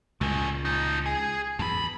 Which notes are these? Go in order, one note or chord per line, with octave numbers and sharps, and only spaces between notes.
C#2 A#2 G#3 A3
F3 D#4
G#4
E2 F3 B5